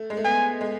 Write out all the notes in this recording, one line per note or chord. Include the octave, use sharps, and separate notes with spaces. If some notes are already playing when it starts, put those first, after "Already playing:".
Already playing: A3
G#3
A3
B3 G#5
G#3